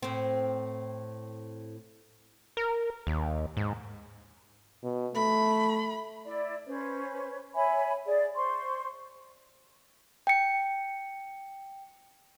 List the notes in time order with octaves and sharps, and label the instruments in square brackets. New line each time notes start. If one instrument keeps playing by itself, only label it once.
[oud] A2 C4
[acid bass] A#4
D#2
G#2
[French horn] B2
[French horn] A3 [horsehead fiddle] B5
[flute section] E4 D5
C#4 B4 C5
C#5 E5 G#5 B5
G#4 D5
C5 C6 C#6
[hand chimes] G5 C#7